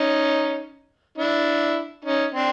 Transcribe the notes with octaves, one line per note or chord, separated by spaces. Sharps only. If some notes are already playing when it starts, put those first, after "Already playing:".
Already playing: C#4 D#4
D4 E4
C#4 D#4
C4 D4